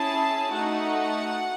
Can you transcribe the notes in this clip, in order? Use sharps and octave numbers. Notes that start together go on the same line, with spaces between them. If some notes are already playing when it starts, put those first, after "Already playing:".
Already playing: C#4 E4 G#4 A5
A3 D#4 F#4 F#5